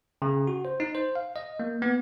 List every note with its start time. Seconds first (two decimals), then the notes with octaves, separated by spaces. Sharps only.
0.22 C#3
0.47 F#4
0.65 C5
0.80 D#4
0.95 C5
1.16 F5
1.36 D#5
1.60 A#3
1.82 B3